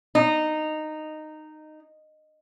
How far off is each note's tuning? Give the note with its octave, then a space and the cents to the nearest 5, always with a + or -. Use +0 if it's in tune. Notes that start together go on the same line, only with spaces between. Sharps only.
D#4 -15